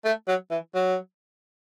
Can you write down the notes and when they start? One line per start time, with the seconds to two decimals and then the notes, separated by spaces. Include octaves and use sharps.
0.05 A3
0.28 F#3
0.51 E3
0.75 F#3